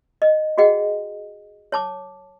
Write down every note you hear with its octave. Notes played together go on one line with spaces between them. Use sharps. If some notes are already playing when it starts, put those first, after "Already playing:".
D#5
F#4 G#4 D#5 F#5 G5
C#5 A5 D6